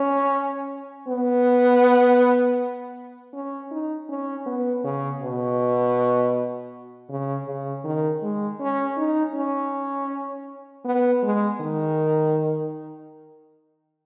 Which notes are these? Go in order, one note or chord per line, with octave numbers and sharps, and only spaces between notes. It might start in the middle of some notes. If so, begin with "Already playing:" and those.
Already playing: C#4
B3
C#4
D#4
C#4
B3
C#3
B2
C#3
C#3
D#3
G#3
C#4
D#4
C#4
B3
G#3
D#3